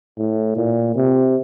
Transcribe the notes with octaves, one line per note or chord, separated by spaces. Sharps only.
A2
A#2
C3